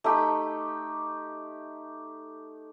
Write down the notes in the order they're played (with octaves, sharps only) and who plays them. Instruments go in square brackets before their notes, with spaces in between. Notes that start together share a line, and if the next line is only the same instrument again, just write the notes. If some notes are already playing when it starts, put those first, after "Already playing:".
[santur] A3 D#4 G4